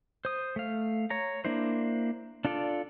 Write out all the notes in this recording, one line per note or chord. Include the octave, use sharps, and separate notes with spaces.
C5 D#6
A3 F5
C#5 A#5
A#3 D4 E4 C5
D4 F4 A4 D5